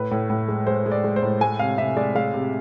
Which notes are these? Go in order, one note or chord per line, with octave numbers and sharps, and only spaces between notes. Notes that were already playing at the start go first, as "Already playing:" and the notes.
Already playing: A2 B4
A2
A2
G#3
G#3 C5
G#3
D5
G#3
C5
A2
G#3 G#5
C3 F5
C3 E5
G#3 D5
G#3 F5
C3